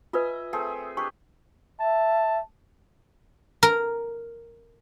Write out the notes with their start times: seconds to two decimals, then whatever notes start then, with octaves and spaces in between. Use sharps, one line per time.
0.13 F4 B4 D#5 E5 G#5
0.53 A3 C4 G#4
0.97 D4 G4 B4 C#6
1.80 E5 A5
3.63 A#4